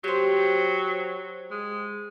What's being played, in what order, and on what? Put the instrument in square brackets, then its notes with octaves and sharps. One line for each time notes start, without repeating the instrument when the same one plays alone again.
[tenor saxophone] F#3 [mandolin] G4 C5
[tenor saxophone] G#3